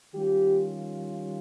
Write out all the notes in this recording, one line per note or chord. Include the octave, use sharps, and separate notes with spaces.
D#3 G3 C#4 F4 G4